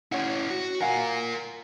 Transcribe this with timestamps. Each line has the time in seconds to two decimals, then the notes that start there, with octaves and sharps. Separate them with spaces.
0.12 C#4 E4 C#5 F#5
0.50 F#4
0.81 F4 A#4 F5 F#5 G#5